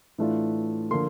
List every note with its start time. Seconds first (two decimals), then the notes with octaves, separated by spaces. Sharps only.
0.18 A2 E3 A3 D4 F4
0.91 D3 F3 A#3 C6